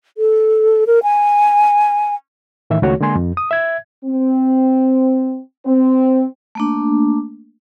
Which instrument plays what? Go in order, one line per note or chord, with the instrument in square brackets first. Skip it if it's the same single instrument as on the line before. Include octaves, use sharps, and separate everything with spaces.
[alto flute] A4
A#4
G#5
[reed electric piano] A2 D#3 E3 E5
C#2 D#3 A3 F#4 C#5
D3 G#3 A#3 G#5 C6
F2
D#6
E5 G#6
[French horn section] C4
C4
[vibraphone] A3 A#3 D4